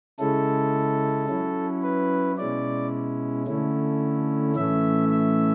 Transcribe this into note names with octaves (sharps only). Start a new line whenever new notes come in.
C#3 G#3 C#4 E4 A4
F#3 C#4 E4
B4
B2 G#3 C#4 E4 D5
D3 A3 C#4 E4
A2 E3 A3 C#4 E5
E5